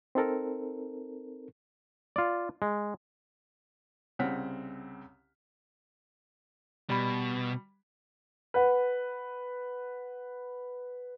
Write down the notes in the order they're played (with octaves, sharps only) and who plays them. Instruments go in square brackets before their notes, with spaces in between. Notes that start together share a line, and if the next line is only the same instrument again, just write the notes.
[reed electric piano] C4 D#4 A4 A#4
[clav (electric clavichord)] F4 D5
G#3
[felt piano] C2 C#3 C4 F#5 F6 B6
[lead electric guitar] B2 [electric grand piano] G3 B5
[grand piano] B4 F#5